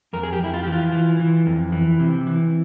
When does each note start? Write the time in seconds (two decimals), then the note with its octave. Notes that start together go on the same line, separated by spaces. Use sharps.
0.13 F2 A#4
0.23 G#4
0.33 G4
0.39 F2 E4
0.54 F4
0.63 E3 G4
0.72 F4
0.92 E3
1.20 E3
1.46 F2
1.72 E3
2.00 C3
2.27 E3